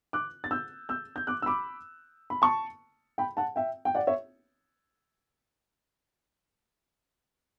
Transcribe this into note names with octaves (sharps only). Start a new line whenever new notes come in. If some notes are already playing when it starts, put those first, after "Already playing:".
D6 F#6
A6
E6 G6
E6 G6
G6
D6 F#6
E6
B5 D6
B5
A5 C#6
G5 B5
F#5 A5
E5 G5
G5
D5 F#5
C#5 E5